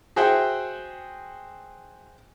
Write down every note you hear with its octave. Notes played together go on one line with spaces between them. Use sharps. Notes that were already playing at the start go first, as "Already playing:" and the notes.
F#4 G#4 C5 E5 F#5 G5